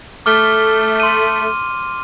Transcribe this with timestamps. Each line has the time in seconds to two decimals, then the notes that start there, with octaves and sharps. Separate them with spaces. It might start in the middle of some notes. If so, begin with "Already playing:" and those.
0.26 A3 D6 F6 G7
1.00 C6 D#7